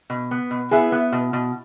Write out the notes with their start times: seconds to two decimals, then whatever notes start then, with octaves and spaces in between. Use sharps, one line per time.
0.10 B2
0.31 B3
0.51 B2
0.71 B3 E4 G#4
0.92 B3
1.12 B2
1.33 B2